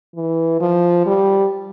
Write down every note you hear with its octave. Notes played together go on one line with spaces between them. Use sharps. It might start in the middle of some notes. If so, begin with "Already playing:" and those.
E3
F3
G3